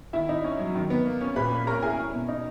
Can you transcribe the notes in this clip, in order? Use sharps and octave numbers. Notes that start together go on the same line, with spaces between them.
D#3 E4 E5
D#4
C#4
F#3
D#3
B3
A#3
C#4
A#2 B4 B5
A#3
C#4 A#4 A#5
E4 G#4 G#5
C#4
B2
D#4